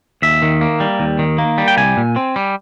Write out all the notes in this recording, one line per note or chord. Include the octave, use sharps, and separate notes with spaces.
D#2 E5
D#3
A#3
G3
D#2
D#3
A#3
G3
G5
C2 G#5
A#2
C4
G3